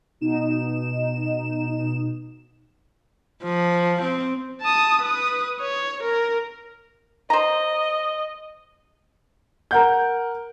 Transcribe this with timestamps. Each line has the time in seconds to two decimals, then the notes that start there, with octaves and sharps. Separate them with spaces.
0.21 B2 D#4 E7
3.43 F3
4.02 C4
4.62 A5 D#6
5.01 B4 D#6
5.61 C#5
6.03 A#4
7.30 C5 D#5 A#5
9.71 A#4 F#5 G6